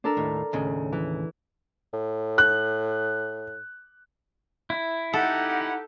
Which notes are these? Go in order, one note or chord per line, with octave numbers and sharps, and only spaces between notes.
D4 A4 A#4
D#2 A2
D#2 A2 C#3
E3
A2
F#6
E4
D#4 G4 A4 F#5